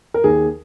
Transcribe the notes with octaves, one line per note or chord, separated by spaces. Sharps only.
A#4
D#2 G#4